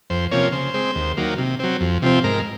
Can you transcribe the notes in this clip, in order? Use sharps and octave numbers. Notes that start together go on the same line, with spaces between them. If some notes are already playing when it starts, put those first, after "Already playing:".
F2 C5
C3 F3 A#3 C#4 C#5
C#3 C5
G#3 C4
D#2
D#3 F#3 A#3
C3
F#3 C4
F2
C3 F3 C4
G#2 A#4